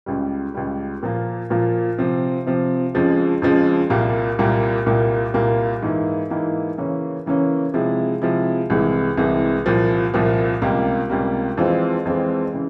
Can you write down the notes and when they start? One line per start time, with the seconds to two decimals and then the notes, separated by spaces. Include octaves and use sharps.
0.06 C#2 C#3 G3
0.54 C#2 C#3 G3
1.03 A#2 F3 A#3 F4
1.50 A#2 F3 A#3 F4
1.98 C3 F3 C4
2.47 C3 F3 C4
2.94 F2 C#3 F3 G#3
3.42 F2 C#3 F3 G#3
3.90 C2 A#2 G3 A#3
4.39 C2 A#2 G3 A#3
4.86 C2 A#2 G3 A#3
5.34 C2 A#2 G3 A#3
5.82 G#2 E3 A#3 E4
6.30 G#2 E3 A#3 E4
6.78 C#3 E3 A#3 C#4
7.26 C#3 E3 A#3 C#4
7.74 C3 F3 G#3 E4
8.22 C3 F3 G#3 E4
8.70 C2 C3 E3 G#3
9.17 C2 C3 E3 G#3
9.66 C2 A#2 F3
10.14 C2 A#2 F3
10.62 C#2 C3 G3 A#3
11.10 C#2 C3 G3 A#3
11.57 F2 E3 G#3 C4 F4
12.05 F2 E3 G#3 C4 F4
12.53 C#3 E3